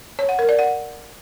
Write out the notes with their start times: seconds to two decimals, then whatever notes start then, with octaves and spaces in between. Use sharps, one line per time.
0.19 C#5
0.29 F#5
0.39 A#4
0.49 D5
0.59 F#5